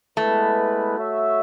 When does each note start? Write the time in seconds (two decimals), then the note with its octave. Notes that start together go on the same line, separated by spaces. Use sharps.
0.17 G#3 A3 B3 E4 B4
0.96 F#4 C#5 E5